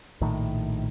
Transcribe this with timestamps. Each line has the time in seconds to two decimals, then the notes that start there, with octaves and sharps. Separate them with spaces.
0.21 A#1 A2 D#3